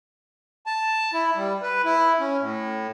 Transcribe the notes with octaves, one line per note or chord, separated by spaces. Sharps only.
A5
E4
G3
B4
E4
C#4
A2